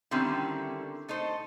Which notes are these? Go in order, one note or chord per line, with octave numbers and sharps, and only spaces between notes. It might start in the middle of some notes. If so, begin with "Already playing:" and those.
D3 D#3 G3 C4 C#4 E4
A3 D#4 A4 C5